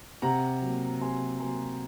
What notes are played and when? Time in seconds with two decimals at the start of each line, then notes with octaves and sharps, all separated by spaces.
0.22 C3 F#5 A#5
0.62 F#3 A#3
1.01 C3 G#5 C6
1.40 F#3 A#3 G#5 C6